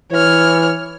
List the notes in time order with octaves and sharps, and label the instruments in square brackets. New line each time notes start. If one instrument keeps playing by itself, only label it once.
[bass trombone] E3 [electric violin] C#5 F6